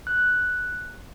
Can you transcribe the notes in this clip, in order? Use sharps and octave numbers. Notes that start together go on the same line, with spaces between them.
F#6